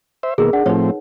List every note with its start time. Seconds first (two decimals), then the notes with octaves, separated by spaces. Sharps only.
0.23 C5 E5
0.38 B2 D#3 A#3 G#4 A#4
0.53 D4 F#5
0.66 A2 F3 C4 D#4 B4 C#5